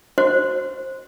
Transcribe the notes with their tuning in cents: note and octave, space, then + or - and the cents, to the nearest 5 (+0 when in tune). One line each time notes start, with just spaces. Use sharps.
F#4 +0 C5 +15